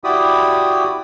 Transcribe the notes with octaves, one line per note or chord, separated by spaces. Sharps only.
E4 F#4 G4 D5 B5 D#6